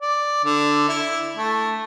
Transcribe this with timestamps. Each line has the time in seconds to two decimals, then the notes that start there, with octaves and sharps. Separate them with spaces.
0.01 D5
0.45 D3
0.89 E4
1.37 A3